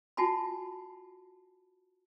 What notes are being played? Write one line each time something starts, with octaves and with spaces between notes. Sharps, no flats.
F4 F#4 G#5 A5 B5